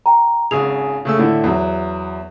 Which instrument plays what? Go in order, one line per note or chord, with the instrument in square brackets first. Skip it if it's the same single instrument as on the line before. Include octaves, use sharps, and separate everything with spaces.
[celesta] G5 A#5
[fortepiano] G#1 C#3 G#4 [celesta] F7
[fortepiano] C#3 A3 E6
A2 D3 E4
E2 F#3